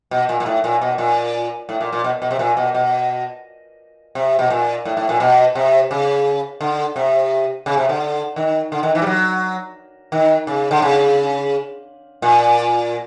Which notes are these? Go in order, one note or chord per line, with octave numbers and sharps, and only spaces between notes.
B2
A#2
A#2
A2
A#2
B2
A#2
A2
A#2
A#2
B2
B2
C3
A#2
B2
B2
C3
B2
A#2
A2
A2
A#2
B2
C3
C#3
D3
C3
C#3
C3
D3
D#3
D3
D#3
E3
G3
F#3
D#3
C#3
D3
C#3
A#2